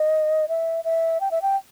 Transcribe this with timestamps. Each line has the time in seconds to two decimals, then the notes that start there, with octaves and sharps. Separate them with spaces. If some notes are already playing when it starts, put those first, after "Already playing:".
Already playing: D#5
0.49 E5
0.84 E5
1.21 G5
1.31 E5
1.42 G5